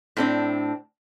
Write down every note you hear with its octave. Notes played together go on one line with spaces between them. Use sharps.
A2 C4 D4